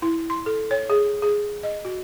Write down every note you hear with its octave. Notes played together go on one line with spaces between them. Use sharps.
E4
C6
A4
C#5
G#4
G#4
D#5
F#4